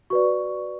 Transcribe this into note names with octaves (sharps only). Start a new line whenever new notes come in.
F#4 B4 D5 C#6